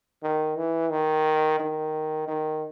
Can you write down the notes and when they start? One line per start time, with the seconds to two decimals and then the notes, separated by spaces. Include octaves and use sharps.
0.23 D#3
0.57 E3
0.90 D#3
1.60 D#3
2.28 D#3